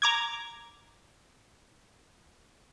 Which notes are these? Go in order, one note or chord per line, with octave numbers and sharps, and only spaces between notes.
A#5 D6 G#6